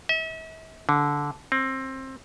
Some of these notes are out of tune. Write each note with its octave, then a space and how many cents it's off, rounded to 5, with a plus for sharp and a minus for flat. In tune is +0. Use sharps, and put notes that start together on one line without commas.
E5 -40
D3 -15
C4 +20